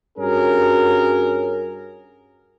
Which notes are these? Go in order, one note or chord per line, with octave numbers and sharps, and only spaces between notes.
G2 C#4 F#4 G#4 A#4